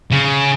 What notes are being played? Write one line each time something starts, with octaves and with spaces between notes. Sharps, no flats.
C#3